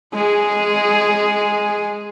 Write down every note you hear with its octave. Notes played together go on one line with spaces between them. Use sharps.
G#3 G#4